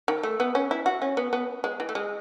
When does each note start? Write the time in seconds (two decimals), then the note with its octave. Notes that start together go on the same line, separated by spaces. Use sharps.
0.08 D#3
0.23 A3
0.40 B3
0.55 C#4
0.71 E4
0.86 F#4
1.02 C#4
1.17 B3
1.33 B3
1.64 G#3
1.80 E3
1.89 A3
1.95 G#3